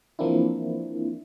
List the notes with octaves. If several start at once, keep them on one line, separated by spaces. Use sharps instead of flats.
E3 F3 A#3 C4 D4 E4